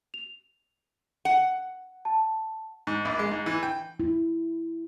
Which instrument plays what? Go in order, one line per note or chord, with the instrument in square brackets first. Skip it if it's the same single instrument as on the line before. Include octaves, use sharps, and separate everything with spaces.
[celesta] F7
[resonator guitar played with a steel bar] F#5
[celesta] A5
[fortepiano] G#2
A#1
G#3
G#2
E3
G5
[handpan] E4